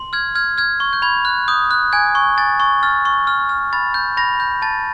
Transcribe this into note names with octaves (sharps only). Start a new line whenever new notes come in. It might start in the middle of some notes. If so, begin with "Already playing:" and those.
Already playing: C6
F6 G#6
F6 G#6
F6 G#6
C#6
G6
B5 G#6
F#6
D#6 G6
F#6
G#5 G#6
C#6
G#5 A6
C#6
F6 A6
C#6
F6
F6
B5 A6
G6
B5 A#6
G6
A5 A6